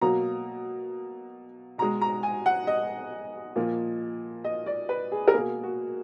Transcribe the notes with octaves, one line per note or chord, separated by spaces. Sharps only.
B2 F#3 A#3 A#5
B2 G#3 A#5
A#5
G#5
F#5
D#5
A#2 F3 A#3
D#5
D5
B4
G#4
A#4
B2 A#3 G#4
F#4